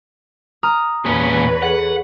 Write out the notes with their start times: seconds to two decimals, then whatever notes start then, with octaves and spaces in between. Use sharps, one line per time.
0.63 A#5 D#6 F6
1.06 E2 A#2 C#4 B4 C#5
1.63 G#4 A4 F#5